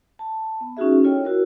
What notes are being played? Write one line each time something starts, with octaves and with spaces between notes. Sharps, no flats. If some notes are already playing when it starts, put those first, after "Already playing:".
A5
B3
C#4 D#4 F4 F#4 G#4 E5
E4 F4 A4 C#5 D#5 G5
E4 F#4 A#4 C#5